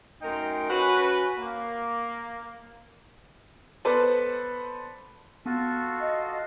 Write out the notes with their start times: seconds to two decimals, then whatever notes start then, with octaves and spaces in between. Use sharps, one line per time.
0.22 F#2 A3 D#4 A#4 G5 C6
0.70 C#4 F#4 B4
1.38 A#3
3.85 B3 A4 B4 C5 D5
5.46 B3 F4 F#4 A4
6.01 D#5 C7